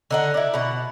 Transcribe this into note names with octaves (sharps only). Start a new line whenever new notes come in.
D3 D#4 F#5
E4 D5
B2 F#5